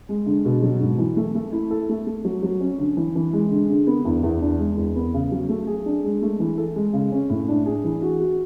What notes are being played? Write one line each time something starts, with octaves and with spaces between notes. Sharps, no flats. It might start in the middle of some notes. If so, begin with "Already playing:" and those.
G#3
D3
B2
F#3
G#2
E3
A3
A3
E4
A4
A3
A3
F#3
F#3
C#4
D3
E3
E3
G#3
D3
D3
B3
E2
E2
D4
G#3
E2
B3
C#3
F#3
A3
G#4
D4
G#3
A3
E3
A4
G#3
C#3
C#4
A2
D4
G#4
E3
F#4
F#4